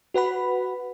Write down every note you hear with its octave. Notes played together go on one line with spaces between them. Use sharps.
F#4 B4 F#5 B5